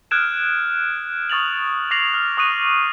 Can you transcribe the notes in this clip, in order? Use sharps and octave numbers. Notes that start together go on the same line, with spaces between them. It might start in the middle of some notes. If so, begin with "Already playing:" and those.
D#6 F6 F#6 G#6 D7 E7
C#6 D#6 A6 F7 F#7
D6 A#6 C7 F7 F#7
F6
C#6 D#6 F#6 D#7 F7